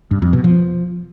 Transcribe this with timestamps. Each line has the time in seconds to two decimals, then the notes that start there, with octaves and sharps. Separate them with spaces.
0.11 G2
0.22 F2
0.33 B2
0.44 F3